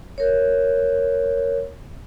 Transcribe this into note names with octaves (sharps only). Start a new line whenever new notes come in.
A#4 C#5